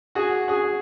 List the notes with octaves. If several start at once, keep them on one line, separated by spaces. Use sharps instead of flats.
F#4 G#4
F#4 G#4